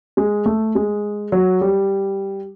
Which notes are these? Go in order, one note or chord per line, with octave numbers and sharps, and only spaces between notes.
G#3
A3
G#3
F#3
G3